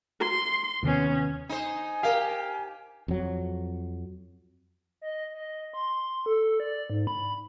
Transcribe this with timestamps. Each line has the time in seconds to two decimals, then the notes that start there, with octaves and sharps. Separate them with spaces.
0.20 C6
0.83 D#2 C3 D#3 B3 C#4
1.49 D#4 C5 G#5
2.03 G4 A#4 F5
3.08 F2 F#3
5.02 D#5
5.34 D#5
5.74 C6
6.26 A4
6.60 D5
6.90 G#2
7.07 B5